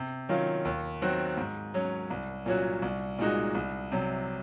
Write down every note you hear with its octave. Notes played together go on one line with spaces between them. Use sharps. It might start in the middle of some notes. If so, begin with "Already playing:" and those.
Already playing: C3
D#3 F#3 C#4 F4
D#2
D#3 F#3 C4 F#4
G#2
F#3 C#4
C2
A#2 F#3 C#4 F#4
C2
A#2 G#3 D#4 F#4
C2
C3 F#3